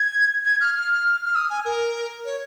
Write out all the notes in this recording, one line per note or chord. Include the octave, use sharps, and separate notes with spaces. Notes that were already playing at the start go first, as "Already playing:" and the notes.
Already playing: G#6
G#6
F6
F6
F6
D#6
G#5
A#4
C#5